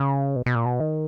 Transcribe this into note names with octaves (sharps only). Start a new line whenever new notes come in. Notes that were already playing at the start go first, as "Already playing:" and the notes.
Already playing: C#3
B2
B2
A#2
B2
D#3